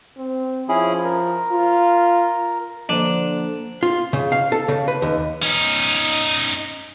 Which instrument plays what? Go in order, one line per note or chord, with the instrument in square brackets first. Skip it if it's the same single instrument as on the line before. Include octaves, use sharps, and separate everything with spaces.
[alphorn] C4
[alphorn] F3 [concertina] C#4 E4 G#4
[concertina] A#4
[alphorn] F4
[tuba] D3 [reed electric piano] F3 C5 [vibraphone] A#3 [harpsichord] D4
[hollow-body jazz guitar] F4
C#3
F5
A4
C#3
B4
D#2
[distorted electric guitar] C#4 D#4